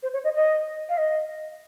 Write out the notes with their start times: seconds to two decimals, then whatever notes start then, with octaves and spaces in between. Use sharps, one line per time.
0.03 C5
0.13 C#5
0.24 D#5
0.35 D#5
0.89 F5
0.98 D#5